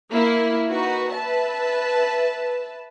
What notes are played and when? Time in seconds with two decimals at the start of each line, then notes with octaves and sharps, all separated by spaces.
0.12 A#3 E4
0.69 D#4 F#4 B4
1.12 B4 E5 A5